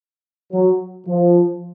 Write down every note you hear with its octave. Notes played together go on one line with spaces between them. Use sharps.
F#3
F3